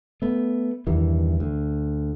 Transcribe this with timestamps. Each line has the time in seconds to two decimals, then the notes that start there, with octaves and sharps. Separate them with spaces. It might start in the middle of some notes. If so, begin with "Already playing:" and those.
0.22 A3 B3
0.87 E2 G2 D#3 E3
1.40 D2